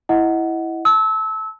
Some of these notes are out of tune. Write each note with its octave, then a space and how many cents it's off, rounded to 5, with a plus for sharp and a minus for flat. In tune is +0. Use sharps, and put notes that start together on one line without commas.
E4 +0 D#5 +15 F#5 +0
A5 +0 E6 -25